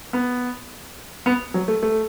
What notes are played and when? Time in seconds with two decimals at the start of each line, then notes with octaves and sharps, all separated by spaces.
0.13 B3
1.26 B3
1.54 F#3
1.68 A3
1.83 A3